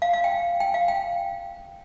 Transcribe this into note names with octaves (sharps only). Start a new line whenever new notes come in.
F5
F5
G5
G5
F5
G5